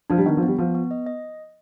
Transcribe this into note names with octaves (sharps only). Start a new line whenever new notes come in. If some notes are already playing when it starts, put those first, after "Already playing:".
F3 D4
G3
D#3 B3
F3
B3
G3
F3 B3
B3
D#5
D#5